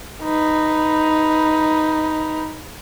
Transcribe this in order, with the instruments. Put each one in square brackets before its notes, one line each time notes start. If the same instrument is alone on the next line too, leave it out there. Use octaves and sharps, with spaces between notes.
[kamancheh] D#4 B4